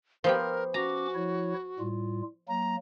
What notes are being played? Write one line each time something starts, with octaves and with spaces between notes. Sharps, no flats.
F3 B3 G4 A#4
C#4 F#4 A#5 D6
F3 E4 C#5
A2 G3 F4
F#3 A#3 A#5